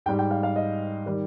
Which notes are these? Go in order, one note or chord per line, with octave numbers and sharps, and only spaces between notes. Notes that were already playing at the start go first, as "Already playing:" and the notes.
G#2 G3 G5
G5
F5
F5
D#5
D#3 G3